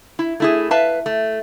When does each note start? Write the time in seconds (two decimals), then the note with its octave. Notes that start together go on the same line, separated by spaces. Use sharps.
0.19 E4
0.40 A3 E4 G#4
0.71 B4 E5 F5 A5
1.06 A3